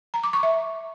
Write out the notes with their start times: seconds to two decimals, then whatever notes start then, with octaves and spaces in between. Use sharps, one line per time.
0.14 A#5
0.24 D6
0.33 C#6
0.43 E5